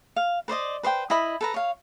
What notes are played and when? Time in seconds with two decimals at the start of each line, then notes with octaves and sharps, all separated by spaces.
0.16 F5
0.48 B4 C5 D5 D#5
0.83 B4 C5 D5 G5
1.10 E4 D#5 B5
1.41 A4 B4 A#5
1.54 C#5 F5